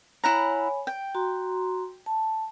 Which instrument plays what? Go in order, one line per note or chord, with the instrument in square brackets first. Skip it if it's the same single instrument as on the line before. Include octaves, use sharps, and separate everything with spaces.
[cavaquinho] E4 F#5 A#5 [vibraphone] C#5 G#5 B5
[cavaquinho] G5
[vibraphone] F#4 A#5 C6
A5